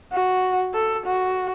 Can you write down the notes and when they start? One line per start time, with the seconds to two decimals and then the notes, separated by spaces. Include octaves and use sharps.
0.12 F#4
0.74 A4
1.06 F#4